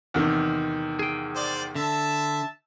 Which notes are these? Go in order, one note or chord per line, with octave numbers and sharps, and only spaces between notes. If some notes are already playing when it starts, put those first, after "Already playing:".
E2 C3 D#3
G#4 G5
C5 D5
D3 E5 A5